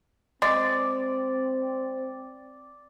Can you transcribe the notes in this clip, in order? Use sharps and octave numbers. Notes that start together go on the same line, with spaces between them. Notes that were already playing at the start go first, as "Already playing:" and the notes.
G#3 C4 D5